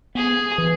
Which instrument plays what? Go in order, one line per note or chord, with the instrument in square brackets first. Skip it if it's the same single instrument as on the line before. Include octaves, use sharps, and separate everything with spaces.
[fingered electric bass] B3 [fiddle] G#4
[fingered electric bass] E3